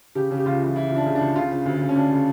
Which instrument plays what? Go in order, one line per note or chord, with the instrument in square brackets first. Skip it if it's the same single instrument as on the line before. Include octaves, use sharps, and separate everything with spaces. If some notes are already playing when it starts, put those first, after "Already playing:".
[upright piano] C#3 G4
C#3
G4
C#2 F4
E3
E3 E4
C#2
D4
C#3
D4
C#2
C#3 F4
C#3
D2
C#3
C#4
D2 D4
C#3